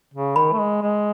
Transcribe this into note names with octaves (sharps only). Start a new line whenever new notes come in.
C#3
D#3 B5
A3
G#3
G#3